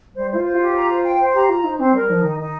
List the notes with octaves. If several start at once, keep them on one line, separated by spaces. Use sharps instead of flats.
G3 C5
F4 C5
C5
F4
G4
A#5
C5
G5
C5
G4 A#5
F4 A#5
D#4 C5
C4 C5
G3 A#4
F3 D#4
D#3 D#4
D#3 D#4